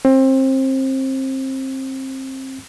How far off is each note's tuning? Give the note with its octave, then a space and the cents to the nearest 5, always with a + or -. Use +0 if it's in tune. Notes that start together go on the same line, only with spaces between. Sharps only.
C4 +25